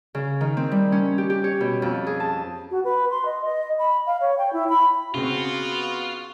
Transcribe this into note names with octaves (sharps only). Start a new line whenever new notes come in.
C#3
D#3
C4
G3
C#4
G4
G4
C#5
B2
F2
G#4
A5
F#4
B4
C6
D#5
D#5
B5
F5
C#5
G5
E4
B5
C#3 B3 C4 F4 F#4